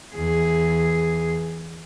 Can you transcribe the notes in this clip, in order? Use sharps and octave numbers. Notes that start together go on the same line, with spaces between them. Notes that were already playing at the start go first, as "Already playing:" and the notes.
E2 G#4